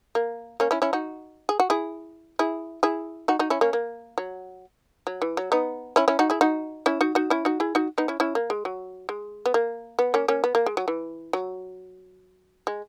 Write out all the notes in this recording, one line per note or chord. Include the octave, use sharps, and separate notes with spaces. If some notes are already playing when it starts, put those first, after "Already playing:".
A#3
A#3 C#4
C#4 E4
C#4 E4
D#4 F#4
G#4
F#4
E4 G#4
E4 G#4
E4 G#4
D#4 F#4
D#4 F#4
C#4 E4
A#3 C#4
A#3
F#3
F#3
E3
F#3
B3 D#4
C#4 E4
C#4 E4
D#4 F#4
E4 G#4
D#4 F#4
C#4 E4
D#4 F#4
D#4 F#4
C#4 E4
D#4 F#4
E4 G#4
D#4 F#4
B3 D#4
C#4 E4
C#4 E4
A#3
G#3
F#3
G#3
B3
A#3
B3
A#3 C#4
A#3 C#4
B3
A#3
G#3
F#3
E3
F#3
G#3